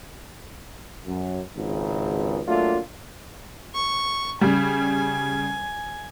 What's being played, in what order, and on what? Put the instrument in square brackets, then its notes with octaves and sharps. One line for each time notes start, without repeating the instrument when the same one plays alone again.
[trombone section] F#2
G#1 C#2
F#3 A3 A#3 D4 F4
[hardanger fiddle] C#6
[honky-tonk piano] C#3 G3 [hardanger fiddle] G#5